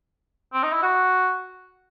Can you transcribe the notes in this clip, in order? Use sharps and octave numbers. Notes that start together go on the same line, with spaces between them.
C4
D#4
E4
F#4